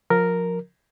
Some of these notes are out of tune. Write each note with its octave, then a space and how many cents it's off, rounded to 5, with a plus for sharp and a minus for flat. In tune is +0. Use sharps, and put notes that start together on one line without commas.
F3 +30 A#4 +0